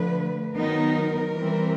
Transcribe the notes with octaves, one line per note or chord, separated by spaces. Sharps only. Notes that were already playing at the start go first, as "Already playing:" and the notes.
Already playing: D3 F3 A3 B4
D#3 F#3 B3 D#4 A#4
E3 G3 C4